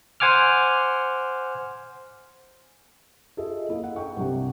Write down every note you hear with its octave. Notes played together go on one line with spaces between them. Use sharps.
C5 F#5 G#5 D6 F6
F4 G#4 A4 D#5 E5
A#3 E4 A4 D#5 F5
F#5
F#5 G5 C#6
C2 G2 C3